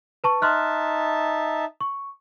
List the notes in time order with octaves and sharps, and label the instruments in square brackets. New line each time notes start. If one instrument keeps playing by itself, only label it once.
[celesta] B4 A5 C#6
[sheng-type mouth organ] D#4 E5 A5 [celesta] C6 F6 F#6
[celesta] C#6